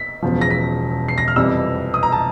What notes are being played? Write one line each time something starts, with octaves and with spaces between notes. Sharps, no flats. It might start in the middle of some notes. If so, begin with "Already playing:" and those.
Already playing: B6
E1 E2 C#3 F3
A#6
B6
C7
A#6
F6
F2 C3 E3 G3 E6
D#6
A#5
A5